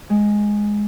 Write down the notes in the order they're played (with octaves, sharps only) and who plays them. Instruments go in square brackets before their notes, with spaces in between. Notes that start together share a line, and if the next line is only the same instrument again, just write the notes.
[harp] G#3